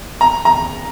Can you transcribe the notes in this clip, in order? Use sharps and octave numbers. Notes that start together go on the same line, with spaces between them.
A#5
A#5